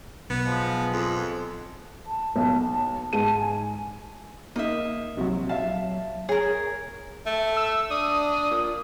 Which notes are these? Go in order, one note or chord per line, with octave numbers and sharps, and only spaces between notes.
B1 B3
F3 G#3
F2
A5
B1
G#2 A5 D#7
G#5
A#3 D#4 D#5 E5
A#1 C3 F#3
E5 F5 A5
G#4 A#4 C#5
A3
E6
D4 D#6
A#2